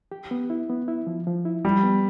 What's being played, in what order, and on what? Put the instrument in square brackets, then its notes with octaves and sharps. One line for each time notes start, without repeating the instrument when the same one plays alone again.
[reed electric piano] G4
B3
E4
B3
E4
F3
F3
E4
[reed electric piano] F3 [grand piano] G3
[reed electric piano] B3